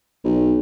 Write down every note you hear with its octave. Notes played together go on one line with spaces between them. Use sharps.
B1